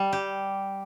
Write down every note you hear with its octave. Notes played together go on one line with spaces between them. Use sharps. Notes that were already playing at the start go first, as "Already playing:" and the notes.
Already playing: G3
G4